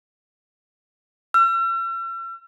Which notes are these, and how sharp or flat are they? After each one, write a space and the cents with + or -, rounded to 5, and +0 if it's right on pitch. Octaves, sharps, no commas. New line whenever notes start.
E6 +45